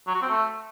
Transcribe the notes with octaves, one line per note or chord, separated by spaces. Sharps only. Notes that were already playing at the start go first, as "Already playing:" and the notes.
F#3
F#4
C4
A3